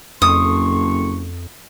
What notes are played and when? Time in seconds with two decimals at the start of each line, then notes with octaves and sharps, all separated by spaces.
0.22 F#1 F2 A4 C6 C#6 D#6